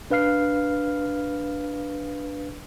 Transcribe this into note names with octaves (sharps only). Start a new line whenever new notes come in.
D4 B4 F5 F6 C7